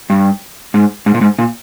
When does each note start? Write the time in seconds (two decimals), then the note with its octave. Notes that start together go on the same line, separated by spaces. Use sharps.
0.10 G2
0.74 G#2
1.06 G#2
1.14 A#2
1.21 G#2
1.39 A#2